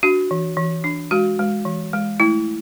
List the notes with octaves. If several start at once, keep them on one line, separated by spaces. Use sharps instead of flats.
D4 F#4
E3
E3
D4
G#3 F#4
G#3
E3
G#3
A3 E4